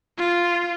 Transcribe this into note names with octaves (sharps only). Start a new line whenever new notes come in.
F4